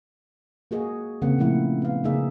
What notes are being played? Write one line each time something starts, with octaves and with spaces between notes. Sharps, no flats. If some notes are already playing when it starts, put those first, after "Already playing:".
A#3 F#4 G#4 D#5
C#3 A#3 C4 F#5
A#2 C#3 F3 A3 E4 F#5
B3 F5
C#3 A#3 D#4 G#4 E5